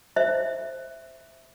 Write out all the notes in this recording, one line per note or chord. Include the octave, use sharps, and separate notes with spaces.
C5 E5